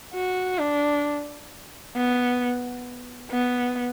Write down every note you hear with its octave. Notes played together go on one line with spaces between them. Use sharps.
F#4
D4
B3
B3